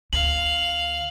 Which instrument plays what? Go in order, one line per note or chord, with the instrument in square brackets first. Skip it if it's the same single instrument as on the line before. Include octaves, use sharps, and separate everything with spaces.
[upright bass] D2 [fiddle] F5 [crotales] F#7